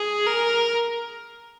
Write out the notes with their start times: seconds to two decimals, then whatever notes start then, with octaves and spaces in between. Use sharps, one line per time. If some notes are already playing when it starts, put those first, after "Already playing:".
Already playing: G#4
0.26 A#4